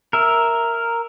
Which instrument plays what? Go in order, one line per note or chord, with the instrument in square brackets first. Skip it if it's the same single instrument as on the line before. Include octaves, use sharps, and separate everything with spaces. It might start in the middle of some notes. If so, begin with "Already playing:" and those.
[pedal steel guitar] A#4 E5